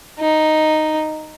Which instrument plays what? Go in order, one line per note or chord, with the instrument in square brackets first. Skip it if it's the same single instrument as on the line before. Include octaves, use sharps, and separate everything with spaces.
[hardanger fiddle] D#4